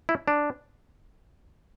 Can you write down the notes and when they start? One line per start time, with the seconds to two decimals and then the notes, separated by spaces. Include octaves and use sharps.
0.09 E4
0.28 D4